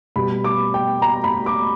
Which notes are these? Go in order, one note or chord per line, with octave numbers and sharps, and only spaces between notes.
B2 G3 B3 B5
D6
G5
A#5
B5
D6